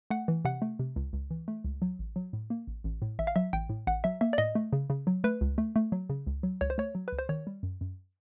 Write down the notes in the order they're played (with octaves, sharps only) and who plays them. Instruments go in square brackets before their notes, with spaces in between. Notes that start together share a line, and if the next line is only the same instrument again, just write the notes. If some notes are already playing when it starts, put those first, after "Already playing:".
[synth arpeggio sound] A3 F#5
E3
C3 F#5
A3
C3
C#2
C#2
E3
A3
C#2
F#3
A1
F#3
A2
A#3
A1
A1
A2
A1 E5
F5
F#3 E5
A1 G5
A2
A1 F#5
F#3 E5
A#3 E5
D5
A2 D#5
A3
C#3
C#3
F#3
A3 B4
C#2
A3
A3
F#3
C#3
C#2
F#3
C#2 C#5
C5
A3 C#5
F#3
C#2 B4
C5
D#3 C#5
G3
F#2
F#2